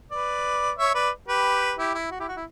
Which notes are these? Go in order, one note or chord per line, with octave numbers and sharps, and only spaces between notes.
B4 D5
C#5 E5
B4 D5
G4 B4
E4 G4
E4
F#4
E4 G4
F#4
E4